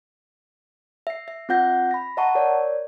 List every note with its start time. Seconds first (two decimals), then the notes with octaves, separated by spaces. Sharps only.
1.07 E5 C7
1.28 E5
1.49 C4 F4 F#5 G6 A#6
1.91 B5 A#6
2.17 D#5 E5 F#5 A5 A#5 C#6
2.35 A#4 C#5 D5